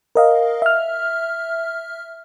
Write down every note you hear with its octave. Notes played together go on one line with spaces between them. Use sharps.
A#4 D#5 F5
E5 F6